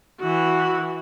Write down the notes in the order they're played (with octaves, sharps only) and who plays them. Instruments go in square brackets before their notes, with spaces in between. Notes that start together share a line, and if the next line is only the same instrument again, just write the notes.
[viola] E3 F#4